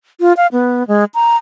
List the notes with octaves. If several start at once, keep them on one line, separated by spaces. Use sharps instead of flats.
F4
F5
B3
G#3
A#5